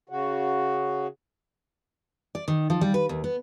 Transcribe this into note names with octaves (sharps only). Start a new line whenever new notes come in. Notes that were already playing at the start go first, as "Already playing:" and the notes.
C#3 F#4
D5
D#3
F3
G3
B4
D#2
B3